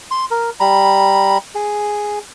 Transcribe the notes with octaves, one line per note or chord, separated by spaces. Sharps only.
C6
A#4
G3 A#5 B5
G#4